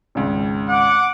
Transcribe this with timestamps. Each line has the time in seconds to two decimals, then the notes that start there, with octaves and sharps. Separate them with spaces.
0.15 G#1 C#2
0.69 F#5 D6